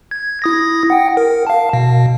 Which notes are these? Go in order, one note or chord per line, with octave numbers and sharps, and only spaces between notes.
G#6
E4 D#6 A#6
F#5 G5
A#4
F5 A5
B2